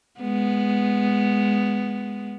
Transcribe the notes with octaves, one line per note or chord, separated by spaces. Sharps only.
G#3 B3